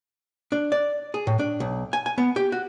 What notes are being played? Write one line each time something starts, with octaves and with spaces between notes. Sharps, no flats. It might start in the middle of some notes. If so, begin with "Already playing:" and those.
D4
D5
G#4
A2
D4
B1
G#5
G#5
B3
G4
F#4